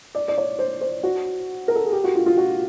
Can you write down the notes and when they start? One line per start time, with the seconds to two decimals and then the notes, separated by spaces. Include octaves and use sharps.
0.15 D5
0.28 D5
0.38 C#5
0.59 C5
0.81 C5
1.03 F#4
1.68 A#4
1.75 A4
1.85 G#4
1.92 G4
2.04 F#4
2.15 F4
2.26 F4
2.37 F#4